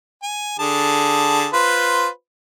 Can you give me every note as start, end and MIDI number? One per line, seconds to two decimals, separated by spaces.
0.23 0.58 80
0.59 1.48 50
0.59 1.48 68
0.59 1.48 81
1.53 2.08 65
1.53 2.08 71
1.53 2.08 72